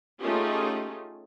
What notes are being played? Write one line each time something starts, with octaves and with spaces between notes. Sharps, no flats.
A3 C#4 D#4 F4 G4 G#4